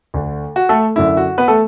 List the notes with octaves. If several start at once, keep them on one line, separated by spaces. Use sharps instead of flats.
D2 D3
F#4
A3 A4
F#2 D3 E4
F#4
B3 B4
A3 A4